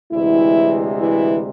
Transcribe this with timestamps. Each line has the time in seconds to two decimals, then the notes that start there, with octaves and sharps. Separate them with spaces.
0.12 D2 C3 E3 G#3 E4
0.99 E3 E4